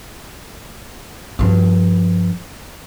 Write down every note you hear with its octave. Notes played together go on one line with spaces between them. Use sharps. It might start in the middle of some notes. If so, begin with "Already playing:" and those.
G2 F3